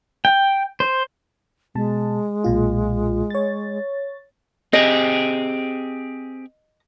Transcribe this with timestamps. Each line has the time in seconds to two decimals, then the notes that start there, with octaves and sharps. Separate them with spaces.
0.25 G5
0.80 C5
1.75 B2 G#3 A5
2.44 B1 A#2 F4
3.30 C#5 A6
4.73 C4 G4 G#4 D#5